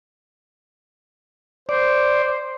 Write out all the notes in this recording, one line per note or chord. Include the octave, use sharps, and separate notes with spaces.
C5 D5